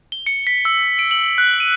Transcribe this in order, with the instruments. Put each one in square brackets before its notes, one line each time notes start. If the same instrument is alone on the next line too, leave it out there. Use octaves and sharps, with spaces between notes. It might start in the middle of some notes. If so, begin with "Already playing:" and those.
[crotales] G7
C#7
B6
E6
D7
F#7
F#6
D#7